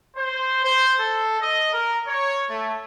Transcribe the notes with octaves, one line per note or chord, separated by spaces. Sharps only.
C5
C5
A4
D#5
A#4
C#5
A3